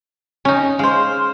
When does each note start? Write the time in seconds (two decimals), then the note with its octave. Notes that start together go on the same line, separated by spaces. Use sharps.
0.45 C#4 D#4
0.79 G#3 C5 F5